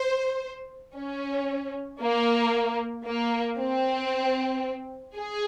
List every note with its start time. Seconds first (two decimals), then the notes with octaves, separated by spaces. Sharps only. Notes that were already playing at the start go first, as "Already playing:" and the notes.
Already playing: C5
0.95 C#4
2.01 A#3
3.06 A#3
3.59 C4
5.17 G#4